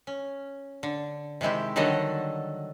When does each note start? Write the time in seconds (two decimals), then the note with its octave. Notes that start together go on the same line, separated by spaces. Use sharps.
0.07 C#4
0.83 D3
1.41 C3 D#3 G#3 E4 G4
1.76 D3 D#3 F#3 G3 A4 D#5